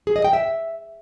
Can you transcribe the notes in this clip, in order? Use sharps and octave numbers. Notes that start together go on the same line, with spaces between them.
G#4
D#5
G5
E5